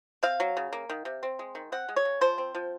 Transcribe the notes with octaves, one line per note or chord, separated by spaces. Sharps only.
C4 F5
F#3
C#3
A#3
D#3
C3
C4
G#3
D#3
C4 F#5
G#3
C#5
C#3
F3 C5
C4
F3